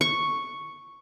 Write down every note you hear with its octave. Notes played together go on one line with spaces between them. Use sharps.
C#6